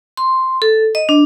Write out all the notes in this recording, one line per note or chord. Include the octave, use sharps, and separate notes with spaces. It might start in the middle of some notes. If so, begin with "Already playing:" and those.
C6
A4
D#5
D4